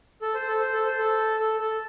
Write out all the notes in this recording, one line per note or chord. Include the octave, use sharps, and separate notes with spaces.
A4
C5
A4
C5
A4
C5
A4
A4
A4